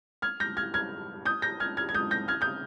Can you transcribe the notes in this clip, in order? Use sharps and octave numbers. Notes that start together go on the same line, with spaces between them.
F6 G#6
G6 A#6
F6 G#6
F6 G#6
D#6 G6
G6 A#6
F6 G#6
F6 G#6
G#6
D#6 G6
G6 A#6
F6 G#6
D#6 G6